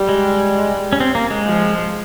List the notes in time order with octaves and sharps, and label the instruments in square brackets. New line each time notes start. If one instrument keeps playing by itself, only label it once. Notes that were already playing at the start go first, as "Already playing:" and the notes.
Already playing: [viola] G3
[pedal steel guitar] G#3
C#4
C4
A#3
G#3
[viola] F3